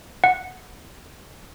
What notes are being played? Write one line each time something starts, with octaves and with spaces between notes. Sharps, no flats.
F#5